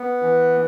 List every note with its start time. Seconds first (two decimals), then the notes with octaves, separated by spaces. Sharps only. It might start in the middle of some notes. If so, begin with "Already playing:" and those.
Already playing: B3
0.22 E3